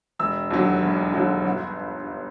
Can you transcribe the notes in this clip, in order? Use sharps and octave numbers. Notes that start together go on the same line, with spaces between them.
E1 E6
D#2 D3 F#3
E1
D#2 D3 F#3
G1